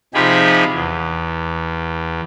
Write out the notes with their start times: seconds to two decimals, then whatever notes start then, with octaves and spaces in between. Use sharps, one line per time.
0.14 C3 F3 D#4 G4 G#4 B5
0.73 E2